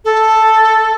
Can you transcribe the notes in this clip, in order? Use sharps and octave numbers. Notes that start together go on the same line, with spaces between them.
A4